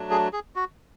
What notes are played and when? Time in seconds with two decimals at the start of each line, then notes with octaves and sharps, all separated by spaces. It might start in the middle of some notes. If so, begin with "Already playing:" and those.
Already playing: F#3 A3 D4
0.11 G#4
0.33 G#4
0.56 F#4